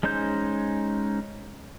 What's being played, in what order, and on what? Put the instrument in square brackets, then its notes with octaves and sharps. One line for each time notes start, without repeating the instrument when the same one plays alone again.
[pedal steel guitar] G#3 C#4 D#4 C5 G6